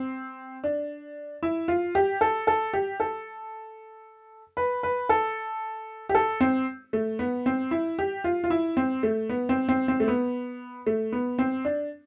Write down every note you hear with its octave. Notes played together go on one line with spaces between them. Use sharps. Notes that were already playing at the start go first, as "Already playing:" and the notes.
Already playing: C4
D4
E4
F4
G4
A4
A4
G4
A4
B4
B4
A4
G4
A4
C4
A3
B3
C4
E4
G4
F4
F4
E4
C4
A3
B3
C4
C4
C4
A3
B3
A3
B3
C4
D4